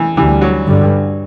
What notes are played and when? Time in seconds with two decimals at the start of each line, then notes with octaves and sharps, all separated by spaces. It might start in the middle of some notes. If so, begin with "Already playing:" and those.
Already playing: E3
0.17 D2 D3 E3 G3
0.41 F#3
0.66 G2 D3 G3